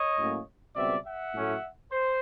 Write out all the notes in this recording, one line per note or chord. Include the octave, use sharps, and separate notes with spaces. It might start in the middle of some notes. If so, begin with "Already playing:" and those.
Already playing: C#5 D#5
A2 F#3 A#3 C#4
C#2 B2 G3 C4 D5 E5
E5 F#5
A2 F#3 A3 C#4
C5